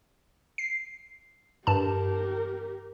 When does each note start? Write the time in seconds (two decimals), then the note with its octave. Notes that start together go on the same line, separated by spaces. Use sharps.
0.58 C7
1.67 G2 G4 A#4 A5